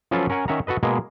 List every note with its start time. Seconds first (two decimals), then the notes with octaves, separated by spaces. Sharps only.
0.11 F3 F#3 C#4 F4 A4 B4
0.30 C#4 A#4 F#5 G#5
0.48 D#3 C#4 E5 F#5 A#5
0.67 F#4 A4 B4 D#5
0.83 B2 G#3 A#3